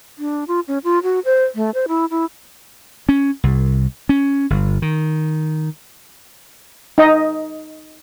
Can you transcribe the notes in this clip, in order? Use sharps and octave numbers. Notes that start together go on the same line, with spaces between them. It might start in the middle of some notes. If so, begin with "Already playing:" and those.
D4
F4
C#4
F4
F#4
C5
A3
C5
E4
E4
C#4
C2
C#4
G1
D#3
D#4 D#5